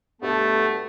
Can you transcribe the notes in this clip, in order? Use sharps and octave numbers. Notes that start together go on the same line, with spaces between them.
G2 B2 A3 B3